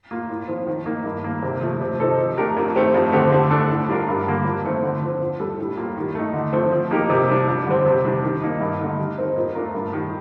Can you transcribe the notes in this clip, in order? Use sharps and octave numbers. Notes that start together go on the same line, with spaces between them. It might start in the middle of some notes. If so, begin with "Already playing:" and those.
A#3 F4
A2
F3 C4 F4
D#3
A#3 D#4 A#4
G2
D#3 A#3
C3
F3 A3
C3
F3 C4 D#4 A4
F3
A3 D4 G4 A#4
F2
D#3 A3 C4 G4
F2
D3 A3 C4 G4
D3
A3 D4 A4
A2
G3 D4 F4 A#4
G2
D3 G3 A#3
F2
D#3 A3 C4
D3
F3 C4
A#2
G3 D4 A4
A2
G3 A#3 F4
D#3
A3 D#4
D3
F3 A3 C4
F3
A#3 D#4 G4 A#4
C3
G3 D4
F2
D3 G3 C4
C3
D#3 G3 D4
D#3
A#3 D#4
G2
D3 A3 D#4
G3
C4 D#4 A#4
A#2
A3 D4 F4 A#4
G2
D#3 G3